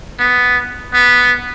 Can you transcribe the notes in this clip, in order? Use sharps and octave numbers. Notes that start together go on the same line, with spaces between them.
B3
B3